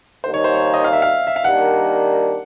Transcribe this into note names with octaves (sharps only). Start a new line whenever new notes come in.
D#2 D#3 G3 A#3 C5
C#5
C5
C#5
D#5
F5
E5
F5
E5
F5
D#3 G3 A#3 D4 F#5